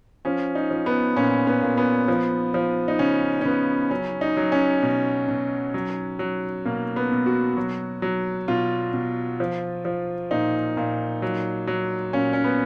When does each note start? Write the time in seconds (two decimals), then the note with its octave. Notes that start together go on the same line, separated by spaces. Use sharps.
0.25 F3 C#4
0.55 D#4
0.71 F3
0.86 B3
1.16 A#2 C#4
1.47 B3
1.62 A#2
1.77 B3
2.08 F3
2.54 F3
2.88 D#4
2.99 C#3 C#4
3.41 C#4
3.45 C#3 B3
3.91 F#3 C#4
4.21 D#4
4.37 F#3
4.52 C#4
4.82 B2
5.28 B2
5.74 F#3
6.19 F#3
6.65 B2 A#3
6.96 B3
7.12 B2
7.26 F#4
7.57 F#3
8.02 F#3
8.48 B2 F4
8.94 B2
9.40 F3
9.85 F3
10.31 A#2 D#4
10.77 A#2
11.22 F#3
11.67 F#3
12.13 A#2 C#4
12.33 C#4
12.44 B3